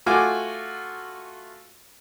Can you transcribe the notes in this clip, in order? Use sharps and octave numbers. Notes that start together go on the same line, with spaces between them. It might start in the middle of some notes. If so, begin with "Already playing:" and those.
A3 F4 F#4 G#5 D6